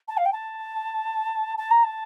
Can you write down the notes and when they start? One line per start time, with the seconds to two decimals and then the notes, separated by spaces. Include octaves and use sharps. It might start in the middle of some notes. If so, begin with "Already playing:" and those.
0.08 A5
0.17 F5
0.25 G5
0.33 A5
1.58 A5
1.71 A#5
1.84 A5